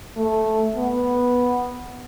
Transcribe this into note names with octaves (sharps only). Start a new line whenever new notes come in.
A3
B3